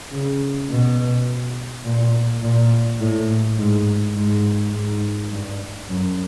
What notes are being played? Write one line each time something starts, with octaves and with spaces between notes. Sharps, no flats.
C#3
B2
A#2
A#2
A2
G#2
G#2
G#2
G2
F#2